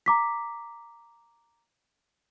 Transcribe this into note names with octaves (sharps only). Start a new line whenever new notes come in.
A#5 D6 B6